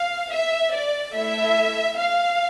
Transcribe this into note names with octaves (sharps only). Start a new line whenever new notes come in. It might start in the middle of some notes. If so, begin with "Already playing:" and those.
Already playing: F5
E5
D5
A3 E4 A4 E5
F5